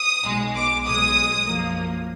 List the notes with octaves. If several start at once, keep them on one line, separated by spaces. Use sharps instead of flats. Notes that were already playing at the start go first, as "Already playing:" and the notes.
Already playing: D#6
B1 B2 G#3
D6
B1 B2 G#3 D#6
F#2 F3 A#3